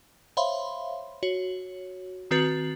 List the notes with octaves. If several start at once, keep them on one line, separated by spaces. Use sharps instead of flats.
C5 C#5 E5 F5 B5 C6
F#4 C#5
D#3 C4 F#4 B4 A6